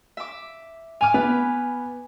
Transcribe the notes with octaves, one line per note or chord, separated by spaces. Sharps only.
E5 D6
G#5 D6 F6 F7
B3 B4